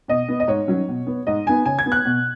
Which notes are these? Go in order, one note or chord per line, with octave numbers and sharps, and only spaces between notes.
B2 D#5
B3
D#5
G#2 C#5
D#3 F#3 C#4
B2
B3
G#2 D#5
D#3 B3 G#5
C#3 G#5
G#6
B3
F#6
B2